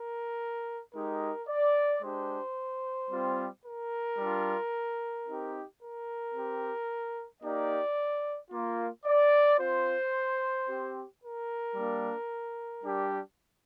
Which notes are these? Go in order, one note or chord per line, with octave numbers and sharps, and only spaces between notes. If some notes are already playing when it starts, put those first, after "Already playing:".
Already playing: A#4
G#3 D#4 G4 A#4
D5
G#3 D4 G4 C5
G3 C4 F4
A#4
G3 D4 F4
C4 D#4 G4
A#4
C4 G4
A#3 D#4 G4 D5
A#3 F4
D5
C4 F4 C5
C4 G4
A#4
G3 A#3 D4
G3 D4 G4